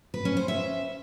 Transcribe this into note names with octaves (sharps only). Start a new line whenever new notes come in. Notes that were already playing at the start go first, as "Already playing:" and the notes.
B4
C#4
C5
E5